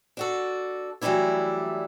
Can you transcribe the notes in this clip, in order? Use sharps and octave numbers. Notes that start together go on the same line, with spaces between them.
D4 F#4 A4
E3 F#3 G3 A3 D4 E4